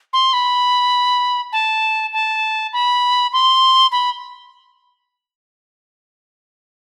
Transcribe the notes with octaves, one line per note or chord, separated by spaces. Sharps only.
C6
B5
A5
A5
B5
C6
B5